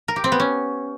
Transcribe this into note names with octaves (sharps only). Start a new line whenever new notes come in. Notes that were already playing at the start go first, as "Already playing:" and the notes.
A#4
G4
C4
B3
C#4